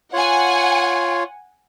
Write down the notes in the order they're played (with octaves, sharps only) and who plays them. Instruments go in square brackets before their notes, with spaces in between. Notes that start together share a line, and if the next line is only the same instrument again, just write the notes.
[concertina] F4 C#5 [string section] F#5 G#5